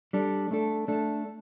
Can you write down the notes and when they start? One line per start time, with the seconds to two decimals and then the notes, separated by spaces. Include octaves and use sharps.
0.13 G3 D4 A4
0.51 A3 D4 A4
0.88 A3 D4 A4